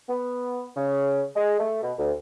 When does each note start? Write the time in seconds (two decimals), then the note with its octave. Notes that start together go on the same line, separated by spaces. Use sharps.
0.08 B3
0.75 C#3
1.35 G#3
1.59 A3
1.82 B2
1.97 D2